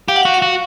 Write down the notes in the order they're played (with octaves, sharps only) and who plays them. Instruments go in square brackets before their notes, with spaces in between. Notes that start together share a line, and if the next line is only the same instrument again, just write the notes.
[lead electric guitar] G4 [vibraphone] F5
[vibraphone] F#5
[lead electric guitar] F#4 [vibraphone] F5
[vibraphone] F5
[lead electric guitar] F#4